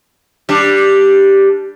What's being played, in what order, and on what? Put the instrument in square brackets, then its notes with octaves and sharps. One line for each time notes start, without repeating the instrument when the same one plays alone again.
[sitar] G3 D4